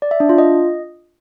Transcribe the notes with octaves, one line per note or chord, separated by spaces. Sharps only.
D5
E5
D4
F4
D#5